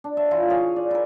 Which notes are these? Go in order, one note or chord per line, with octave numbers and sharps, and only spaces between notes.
D4
C#5 E5
E3 E4 F4
G#4 C#5 F5
D5
E4 A#4